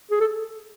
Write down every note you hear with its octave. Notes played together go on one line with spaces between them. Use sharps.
G#4
A4